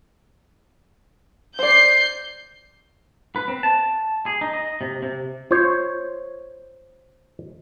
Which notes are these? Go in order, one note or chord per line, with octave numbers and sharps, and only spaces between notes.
C5 D5 G6 C7
B4
C4
A5
G#4
D#4
D#5
C3
C3
F4 C5 C#5